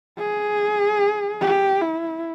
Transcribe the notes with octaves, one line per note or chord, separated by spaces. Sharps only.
G#4
G4
E4